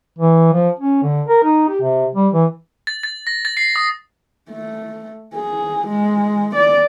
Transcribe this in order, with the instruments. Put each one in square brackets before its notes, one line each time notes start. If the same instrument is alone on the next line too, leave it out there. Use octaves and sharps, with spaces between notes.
[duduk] E3
F3
C#4
D3
A#4
D#4
G4
C3
G3
E3
[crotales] A6
A6
A#6
A6
C7
D#6
[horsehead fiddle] A3
G#4
G#3
D5